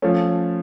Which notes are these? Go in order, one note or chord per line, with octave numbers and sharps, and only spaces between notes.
F3 A3 C#4